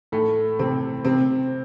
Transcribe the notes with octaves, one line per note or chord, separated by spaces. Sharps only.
A2 A3
C3 C4
C3 C4